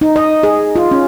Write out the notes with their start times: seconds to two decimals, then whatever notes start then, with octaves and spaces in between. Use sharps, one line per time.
0.01 D#4
0.16 D#5
0.43 G#4
0.76 F4
0.91 C#4